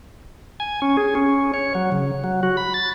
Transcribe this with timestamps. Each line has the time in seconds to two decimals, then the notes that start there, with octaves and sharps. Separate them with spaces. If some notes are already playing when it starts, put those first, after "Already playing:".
0.60 G#5
0.82 C#4
0.97 G#4
1.15 C#4
1.54 C#5
1.75 F#3
1.92 C#3
2.24 F#3
2.43 F#4
2.57 B5
2.74 A6